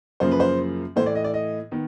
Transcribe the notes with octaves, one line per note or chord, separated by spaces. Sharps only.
F#2 C#3 F3 A#3 C5
B4
C5
A2 E3 A3 C5
D5
D#5
D5
D#5
D#3 B3